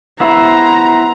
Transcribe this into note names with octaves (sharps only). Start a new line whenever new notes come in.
B3 E4 C5 A#5